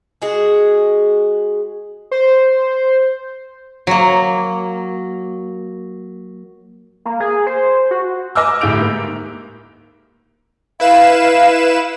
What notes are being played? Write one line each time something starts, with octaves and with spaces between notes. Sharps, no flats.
G#3 F#4 G#4
C5
F#3 A#3
A#3
G#4
C5
F#4
D#5 G#5 D6 E6 F6
D2 A2 G4 G6 D7 F7
G#2 A#3
E4 B4 F5 E7